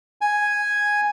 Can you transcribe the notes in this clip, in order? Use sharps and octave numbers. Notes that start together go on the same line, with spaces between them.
G#5